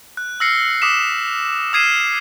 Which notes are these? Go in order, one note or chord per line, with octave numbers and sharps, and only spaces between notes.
F#6
E6 F6 A#6 C7 C#7
D6 D#6 B6 E7
D#6 F6 G#6 C7 D#7 E7